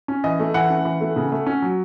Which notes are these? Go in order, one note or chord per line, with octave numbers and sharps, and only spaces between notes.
C#4
E3 D#5
A3
E3 F#5
C#4
E3
A3
C#3
A3
C#4
F#3